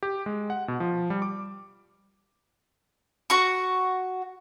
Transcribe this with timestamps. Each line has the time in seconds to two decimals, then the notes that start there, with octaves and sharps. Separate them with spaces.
0.03 G4
0.26 G#3
0.50 F#5
0.68 B2
0.80 F3
1.10 G3
1.22 D6
3.30 F#4 C#6